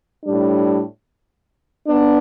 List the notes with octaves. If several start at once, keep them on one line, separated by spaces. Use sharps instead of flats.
A2 G3 D4
B3 D4